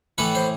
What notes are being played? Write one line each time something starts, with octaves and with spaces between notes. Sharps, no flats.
A2 E3 A4 B4
C5